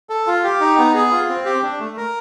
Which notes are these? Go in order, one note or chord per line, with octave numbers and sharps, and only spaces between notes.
A4
F4
G4
D#4
B3
G#4
F4
C4
G4
D4
A3
A#4